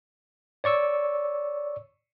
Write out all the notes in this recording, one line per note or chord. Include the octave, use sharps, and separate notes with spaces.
C#5 D5 C#6 E6